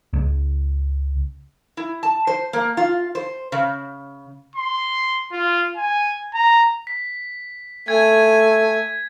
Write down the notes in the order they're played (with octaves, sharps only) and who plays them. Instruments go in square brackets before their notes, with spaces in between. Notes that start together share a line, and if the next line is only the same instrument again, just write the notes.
[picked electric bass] C#2
[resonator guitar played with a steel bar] E4
A5
C5
A#3
F4
C5
C#3
[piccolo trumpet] C6
F4
G#5
A#5
[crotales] B6
[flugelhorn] A3 [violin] G#5 [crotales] G#6